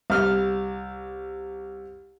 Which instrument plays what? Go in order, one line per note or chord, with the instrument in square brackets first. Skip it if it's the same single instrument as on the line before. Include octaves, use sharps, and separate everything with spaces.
[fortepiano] C2 F6